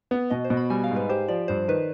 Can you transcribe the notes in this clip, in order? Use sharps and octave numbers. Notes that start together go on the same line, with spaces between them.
B3
B2 D#5
C5
B2
B5
G3 G#5
F5
G#2
B4
G4 C5
F3 D5
G2 C5
D#3 B4